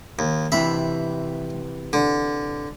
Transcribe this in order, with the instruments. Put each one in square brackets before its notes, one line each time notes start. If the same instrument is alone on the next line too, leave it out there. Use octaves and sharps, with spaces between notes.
[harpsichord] D#2
[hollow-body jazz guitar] C3 E3 [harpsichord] E5 B5
[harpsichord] D3